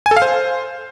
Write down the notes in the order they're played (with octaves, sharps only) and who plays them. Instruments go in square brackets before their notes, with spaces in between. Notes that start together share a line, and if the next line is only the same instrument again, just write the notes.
[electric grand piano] G#5
A4
F5
C5